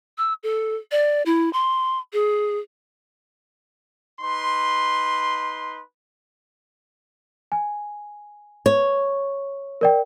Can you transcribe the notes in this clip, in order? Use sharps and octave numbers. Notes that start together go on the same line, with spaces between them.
E6
A4
D5
E4
C6
G#4
D#4 B4 C6
G#5
C#5
A#4 D5 G5